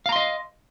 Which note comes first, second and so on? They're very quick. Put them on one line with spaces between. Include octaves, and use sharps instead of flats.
F5 A#5 C6 D#5